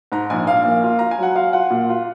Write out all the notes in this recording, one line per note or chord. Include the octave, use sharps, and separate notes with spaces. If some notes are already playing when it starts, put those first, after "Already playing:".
G#2 A#5
A#1 G#5
A#1 F5
A#3
F4
F4 A#5
G#5
F#3 F#5
F4 F5
F4 F#5
A#2
F4